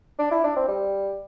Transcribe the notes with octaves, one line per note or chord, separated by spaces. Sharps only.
D4
E4
D4
C4
G3